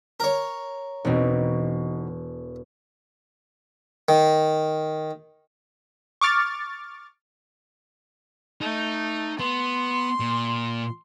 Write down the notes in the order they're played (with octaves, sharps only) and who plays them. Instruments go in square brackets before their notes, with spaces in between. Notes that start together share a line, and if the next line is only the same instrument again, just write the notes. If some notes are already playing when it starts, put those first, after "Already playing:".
[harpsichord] A#4 C#5
[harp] E1 [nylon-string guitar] B2 C4 D#4
[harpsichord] D#3
[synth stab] C#6 D6 F6 A6
[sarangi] A3 [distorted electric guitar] D#4
[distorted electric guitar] B3 [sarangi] C6
[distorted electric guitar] A#2